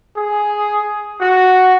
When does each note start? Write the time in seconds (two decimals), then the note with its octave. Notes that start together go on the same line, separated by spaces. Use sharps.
0.17 G#4
1.21 F#4